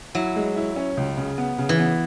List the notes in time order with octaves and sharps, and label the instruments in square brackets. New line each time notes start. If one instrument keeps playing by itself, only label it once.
[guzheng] F#3 [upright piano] E4
[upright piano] G#3
E4
C#4
C#2
C#3
B3
C#3
[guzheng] E3
[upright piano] B3